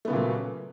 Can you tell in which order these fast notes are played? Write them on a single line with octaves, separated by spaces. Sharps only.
A3 B3 C#3 A#2 F#3